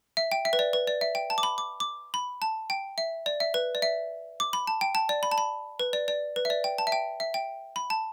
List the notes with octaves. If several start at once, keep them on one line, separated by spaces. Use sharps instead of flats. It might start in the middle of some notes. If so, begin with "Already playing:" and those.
E5
G5
E5
B4
D5
B4
D5
E5
G5
A5
D6
B5
D6
D6
B5
A5
G5
E5
D5
E5
B4
D5
E5
D6
B5
A5
G5
A5
D5
B5
A5
B5
B4
D5
D5
B4
E5
D5
G5
A5
E5
G5
E5
G5
B5
A5